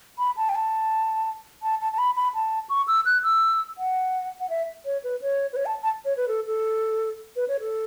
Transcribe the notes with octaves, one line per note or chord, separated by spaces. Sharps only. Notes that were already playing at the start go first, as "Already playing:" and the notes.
B5
A5
G5
A5
A5
A5
A5
B5
B5
A5
C#6
E6
F#6
E6
F#5
F#5
E5
C#5
B4
C#5
B4
C#5
A5
A5
C#5
B4
A4
A4
B4
C#5
A4